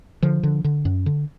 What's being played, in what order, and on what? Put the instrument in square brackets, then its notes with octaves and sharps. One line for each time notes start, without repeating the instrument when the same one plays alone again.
[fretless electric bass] D3 F3
D3
D3
F#2
D3